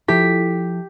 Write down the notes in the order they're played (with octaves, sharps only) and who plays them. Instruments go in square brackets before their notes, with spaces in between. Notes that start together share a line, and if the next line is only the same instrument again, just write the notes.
[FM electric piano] F3 E4 A4 [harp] G4 B6